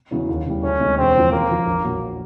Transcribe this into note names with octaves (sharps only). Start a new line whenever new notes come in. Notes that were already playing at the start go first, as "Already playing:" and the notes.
E2 C#3 F#3
D#2
C#3 E3 G3
D2 C#4
C3 D#3 G#3
E1 C4
E2 C#3 F3
F2 A#3
C#3 F3
A#1
A#2 F#3